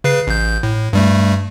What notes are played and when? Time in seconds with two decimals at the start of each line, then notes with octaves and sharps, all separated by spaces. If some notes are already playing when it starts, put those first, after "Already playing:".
0.04 C#3 B4 C7
0.27 A1 G6
0.63 A2
0.93 G2 G3 A3